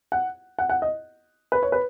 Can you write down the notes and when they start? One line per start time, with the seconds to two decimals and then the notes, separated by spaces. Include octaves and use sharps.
0.12 F#5
0.59 F#5
0.70 F#5
0.82 D#5
1.52 B4
1.63 C#5
1.72 B4